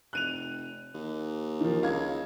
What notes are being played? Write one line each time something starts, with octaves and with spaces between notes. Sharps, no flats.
F1 F#6 D#7 F7
D#2
D#3 F3
C#2 F5 G#6